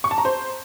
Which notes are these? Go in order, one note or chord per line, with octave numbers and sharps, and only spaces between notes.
C#6
A5
A#5
C5